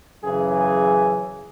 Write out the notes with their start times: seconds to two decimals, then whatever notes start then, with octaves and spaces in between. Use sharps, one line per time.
0.23 F#2 C#3 E3 G#4
0.52 G#4